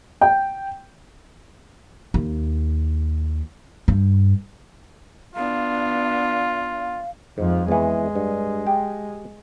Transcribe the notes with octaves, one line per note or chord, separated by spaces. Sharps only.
G5
D#2
G2
B3 D4 F4 F5
F2 G#2 F3
E2 E3 G#3
G2
G4 G5